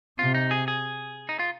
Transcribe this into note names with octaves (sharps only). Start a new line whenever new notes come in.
C3 F4
D#4
G#4
G#4
D#4
F4